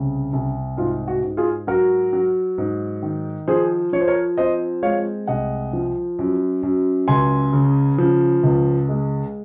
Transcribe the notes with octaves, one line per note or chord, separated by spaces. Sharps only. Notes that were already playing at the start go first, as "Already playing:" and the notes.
Already playing: C2 C#3
C2
G#2 F4
F#4
G#2
F4 G#4
F#3 F#4 A#4
F#3
G#2
D#3
F3 G#4 C5
F3 C#5
C5
A#4 C#5
C4 C5 D#5
G#3 C#5 F5
C2 D#5 F#5
F3
F#2
F#2
C#2 G#5 C6
C#3
F3
C#2
G#3